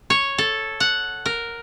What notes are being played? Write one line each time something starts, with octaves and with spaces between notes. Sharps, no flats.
C#5
A4
F#5
A#4